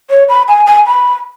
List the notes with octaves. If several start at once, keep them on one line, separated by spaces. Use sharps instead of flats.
C#5
B5
G#5
G#5
B5